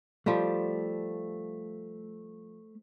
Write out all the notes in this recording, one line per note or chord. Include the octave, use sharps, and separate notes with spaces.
F3 G3 A3 G4